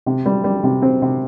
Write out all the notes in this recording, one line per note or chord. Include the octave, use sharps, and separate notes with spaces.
C3
G3
G3
C3
C4
C3